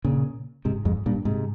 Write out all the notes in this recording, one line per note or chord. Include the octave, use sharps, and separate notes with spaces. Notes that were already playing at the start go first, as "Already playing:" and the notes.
A#2 C#3
G#2 C3
F2 G#2
G2 A#2
G#2 C3